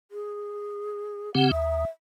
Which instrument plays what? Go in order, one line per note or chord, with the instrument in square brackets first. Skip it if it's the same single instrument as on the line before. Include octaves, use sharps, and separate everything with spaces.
[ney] G#4
[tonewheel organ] C#3 C4 G4 [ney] F#5
[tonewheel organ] D#2 [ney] E5